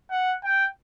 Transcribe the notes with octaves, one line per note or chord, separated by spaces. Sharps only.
F#5
G5